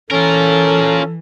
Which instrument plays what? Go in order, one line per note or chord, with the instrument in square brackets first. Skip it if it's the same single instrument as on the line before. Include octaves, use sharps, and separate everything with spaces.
[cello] E3 [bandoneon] C#4 [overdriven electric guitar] F4 A#4 [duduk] A4